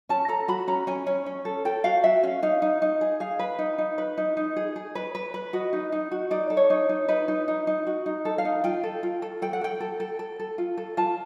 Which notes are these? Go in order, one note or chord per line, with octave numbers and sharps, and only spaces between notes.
C#4 A5
A4 A#5
F#4 B5
C#4 A#5
C#4 G#5
C#4
C#4
A4
A4 G5
F#4 F5
F#4 E5
C#4 F5
D#4 F5
D#4
D#4
G#4
G#4 F5
B4
D#4
D#4
B4
D#4
D#4
G#4
G#4
B4
B4
B4
F#4 D#5
D#4
D#4
F#4
D#4 D5
A4
C#5
D#4
D#4
D#4 B4
D#4
D#4
D#4
F#4
D#4
A4
F5
D#4
F4 G5
A4
F4
A4
A4 G5
F#5
A4 G5
A4
A4
A4
A4
F4
A4
F4 A5